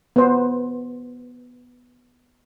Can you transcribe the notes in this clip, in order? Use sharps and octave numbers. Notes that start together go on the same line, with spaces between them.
B3 C5